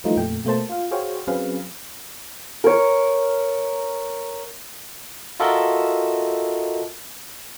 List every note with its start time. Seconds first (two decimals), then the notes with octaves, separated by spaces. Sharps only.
0.04 E3 F3 G3 A3 D#4 F4
0.16 F2 A#2 A3 G5
0.45 B2 A3 A#3 C5 A5
0.69 F4 F5
0.91 F#4 G#4 C5 C#5 F5 G5
1.27 F#3 C4 C#4 G#4 B4 F5
2.64 A#4 C#5
5.40 F4 F#4 A4 A#4 D#5 E5